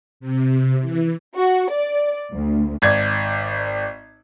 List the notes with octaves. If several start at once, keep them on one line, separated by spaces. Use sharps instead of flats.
C3
E3
F#4
D5
D2
G#1 D5 G#6